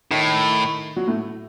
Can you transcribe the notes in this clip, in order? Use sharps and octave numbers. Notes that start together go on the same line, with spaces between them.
A2 D#3 D#4
F#3 F#4
A2 A3